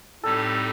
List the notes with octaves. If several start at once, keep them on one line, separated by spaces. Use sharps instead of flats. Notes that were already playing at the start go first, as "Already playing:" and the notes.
A2 G3 C4 D#4 G4 A4